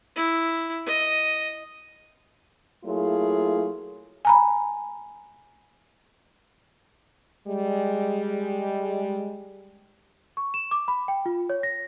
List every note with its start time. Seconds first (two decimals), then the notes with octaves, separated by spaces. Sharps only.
0.16 E4
0.87 D#5
2.85 F#3 A3 A#3 E4 F4 G#4
4.25 G#5 A#5 B5
7.48 G3 G#3
10.37 C#6
10.54 E7
10.71 D6
10.88 B5
11.08 G5
11.26 F4
11.50 C#5
11.63 A#6